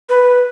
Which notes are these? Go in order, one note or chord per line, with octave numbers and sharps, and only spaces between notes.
B4